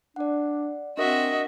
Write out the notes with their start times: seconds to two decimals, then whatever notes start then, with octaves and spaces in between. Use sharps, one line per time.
0.16 D4 D5 F#5
0.97 C4 D4 F#4 A#4 D#5 E5